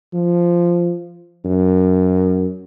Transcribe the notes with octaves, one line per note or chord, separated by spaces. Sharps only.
F3
F#2